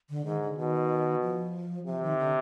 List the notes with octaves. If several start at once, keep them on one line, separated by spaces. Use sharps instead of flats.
D3
G#2 D#3
D3
B2 D#3
F3
C3 F3
D#3
D3